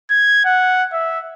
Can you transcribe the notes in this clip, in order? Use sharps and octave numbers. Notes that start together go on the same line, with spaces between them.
G#6
F#5
E5